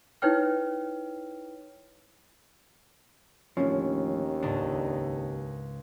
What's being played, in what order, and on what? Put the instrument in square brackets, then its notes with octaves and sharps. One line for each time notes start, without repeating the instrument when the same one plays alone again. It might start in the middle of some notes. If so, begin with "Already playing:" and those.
[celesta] D#4 E4 B4 C#5 G5 F6
[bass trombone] D#2 [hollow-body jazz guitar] A2 D3 F3 [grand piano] C#4
[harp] C#2 G#2 [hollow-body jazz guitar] D4